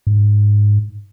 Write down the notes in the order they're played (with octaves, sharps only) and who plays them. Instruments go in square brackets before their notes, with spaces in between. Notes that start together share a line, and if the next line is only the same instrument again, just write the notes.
[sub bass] G#2